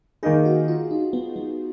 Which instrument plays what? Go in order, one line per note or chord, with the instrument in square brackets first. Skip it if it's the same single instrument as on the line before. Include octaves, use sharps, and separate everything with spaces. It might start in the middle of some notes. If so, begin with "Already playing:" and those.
[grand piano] D#3 A#3 D#4 [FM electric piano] G#4
[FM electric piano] F#4
F4
D#4
B3
B3